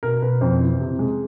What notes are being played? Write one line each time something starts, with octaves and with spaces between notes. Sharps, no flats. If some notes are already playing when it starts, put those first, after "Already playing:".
B2 A#4
B2 B4
F2 C5
E3
C3
G#3